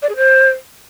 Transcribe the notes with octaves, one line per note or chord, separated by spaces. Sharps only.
D5
G#4
C5